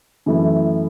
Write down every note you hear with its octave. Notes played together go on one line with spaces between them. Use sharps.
F#2 E3 A3 E4